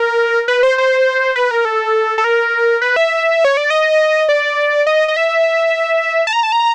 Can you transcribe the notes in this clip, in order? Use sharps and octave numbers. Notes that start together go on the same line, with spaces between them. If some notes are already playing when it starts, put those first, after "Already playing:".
Already playing: A#4
B4
C5
C5
B4
A#4
A4
A4
A#4
B4
E5
C#5
D5
D#5
D5
D#5
D#5
E5
A5
A#5
A5
A#5